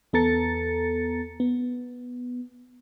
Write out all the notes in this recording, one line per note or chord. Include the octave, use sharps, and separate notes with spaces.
E2 B3 A4 A#5 A6 C#7
B3